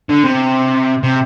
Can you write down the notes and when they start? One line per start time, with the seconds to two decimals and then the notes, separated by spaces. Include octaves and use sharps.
0.10 D3
0.24 C3
1.03 C3